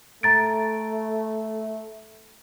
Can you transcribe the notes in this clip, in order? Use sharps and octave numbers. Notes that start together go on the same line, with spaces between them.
A3 A#5 A6 D7